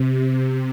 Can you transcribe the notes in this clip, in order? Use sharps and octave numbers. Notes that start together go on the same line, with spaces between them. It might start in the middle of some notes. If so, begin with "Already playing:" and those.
Already playing: C3